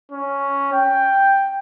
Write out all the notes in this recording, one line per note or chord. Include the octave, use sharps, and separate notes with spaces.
C#4
G5